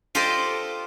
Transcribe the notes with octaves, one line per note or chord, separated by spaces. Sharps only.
F4 G4 A4 C5 D5 D#5